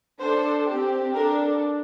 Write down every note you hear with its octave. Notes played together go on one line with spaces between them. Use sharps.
D4 A4 C5
C4 G4
D4 A4 A#4